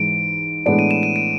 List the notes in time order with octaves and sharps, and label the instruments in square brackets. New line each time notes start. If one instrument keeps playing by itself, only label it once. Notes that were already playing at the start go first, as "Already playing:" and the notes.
Already playing: [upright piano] G#2 E3 G#3 [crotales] D7
[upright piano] A2 E3 G#3 B3 D4 [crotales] D7
[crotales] D#7
E7
D#7
D7